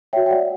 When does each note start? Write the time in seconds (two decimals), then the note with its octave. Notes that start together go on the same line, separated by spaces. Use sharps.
0.13 F#4 C#5 E5 G5
0.26 G5
0.31 D5 F#5